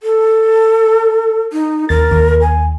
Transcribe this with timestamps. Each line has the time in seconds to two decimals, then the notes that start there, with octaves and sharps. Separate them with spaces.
0.03 A4
1.53 D#4
1.89 D#2 A#4 A6
2.11 D#2
2.41 G#5